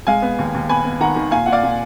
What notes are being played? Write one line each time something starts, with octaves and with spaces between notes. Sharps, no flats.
G#3 F5 G#5
B3
D#2
D#2
B3 G#5 B5
B3
D#3 F#5 A#5
D#3
A#2 F5 G#5
A#2 F#5
D5 F5
A#2